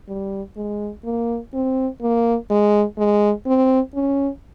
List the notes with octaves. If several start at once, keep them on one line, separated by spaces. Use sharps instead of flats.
G3
G#3
A#3
C4
A#3
G#3
G#3
C4
C#4